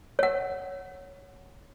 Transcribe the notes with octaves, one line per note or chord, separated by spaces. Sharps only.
C#5 F#5